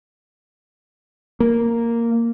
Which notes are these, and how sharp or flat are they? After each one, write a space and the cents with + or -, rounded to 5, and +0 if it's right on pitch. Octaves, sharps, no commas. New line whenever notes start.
A#3 -5